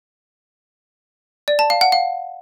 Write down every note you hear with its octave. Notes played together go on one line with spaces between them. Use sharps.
D5
A5
F5
F#5
F5